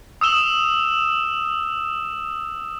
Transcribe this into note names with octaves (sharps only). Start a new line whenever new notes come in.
D#6 E6 E7 G7